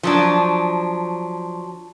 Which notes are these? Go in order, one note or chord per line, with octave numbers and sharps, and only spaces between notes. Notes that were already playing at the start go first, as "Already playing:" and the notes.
F3 F#3 D4